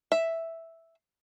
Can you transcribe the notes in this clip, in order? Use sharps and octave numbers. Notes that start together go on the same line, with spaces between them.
E5